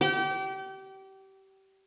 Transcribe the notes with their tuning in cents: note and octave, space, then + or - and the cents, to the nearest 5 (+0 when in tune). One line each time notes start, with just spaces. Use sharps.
G4 -25 G5 -35